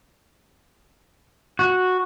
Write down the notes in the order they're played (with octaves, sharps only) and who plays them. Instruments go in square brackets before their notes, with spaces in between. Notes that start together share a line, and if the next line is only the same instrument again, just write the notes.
[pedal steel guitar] F#4